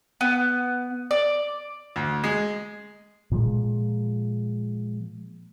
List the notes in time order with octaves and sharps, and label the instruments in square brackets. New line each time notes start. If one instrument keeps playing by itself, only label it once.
[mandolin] B3
D5
[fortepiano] D2
G#3
[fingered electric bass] A#2 F3 G#3